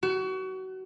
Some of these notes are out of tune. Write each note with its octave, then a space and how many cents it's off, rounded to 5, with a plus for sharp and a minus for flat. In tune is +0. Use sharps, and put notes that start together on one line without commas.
F#4 +30